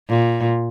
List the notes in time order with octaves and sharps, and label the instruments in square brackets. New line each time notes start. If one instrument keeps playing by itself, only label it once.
[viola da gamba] A#2